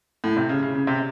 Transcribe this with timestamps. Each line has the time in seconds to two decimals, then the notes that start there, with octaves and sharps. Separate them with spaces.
0.24 A2
0.37 C3
0.49 C#3
0.63 C#3
0.75 C#3
0.87 C3